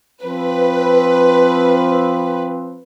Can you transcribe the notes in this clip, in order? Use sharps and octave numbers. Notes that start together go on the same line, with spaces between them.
F3 C4 B4